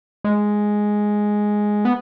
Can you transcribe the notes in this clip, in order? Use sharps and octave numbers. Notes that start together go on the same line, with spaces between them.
G#3
B3